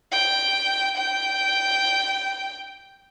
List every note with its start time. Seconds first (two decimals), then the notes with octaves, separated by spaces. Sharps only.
0.12 G5
0.97 G5